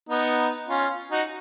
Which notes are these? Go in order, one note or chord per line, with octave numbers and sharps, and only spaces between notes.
B3 D#4
C#4 F4
D#4 F#4